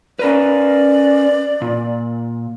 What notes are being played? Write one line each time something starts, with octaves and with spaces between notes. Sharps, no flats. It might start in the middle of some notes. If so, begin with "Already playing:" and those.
C#4 A#4 B4 D5
A#2